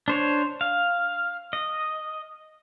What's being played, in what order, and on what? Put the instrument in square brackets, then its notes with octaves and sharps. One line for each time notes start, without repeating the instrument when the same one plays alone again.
[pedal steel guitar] D4 C5 C#5
F5
D#5